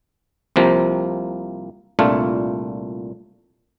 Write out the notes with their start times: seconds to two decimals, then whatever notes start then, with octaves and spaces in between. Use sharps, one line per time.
0.56 C2 C3 F3 A#3
1.99 C2 A#2 A3 D4 F4